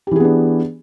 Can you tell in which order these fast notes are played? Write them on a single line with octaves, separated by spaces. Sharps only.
G4 E3 G#4 B3 D4